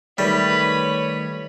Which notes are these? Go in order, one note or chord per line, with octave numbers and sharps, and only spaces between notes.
D#3 G3 A3 B4 C#5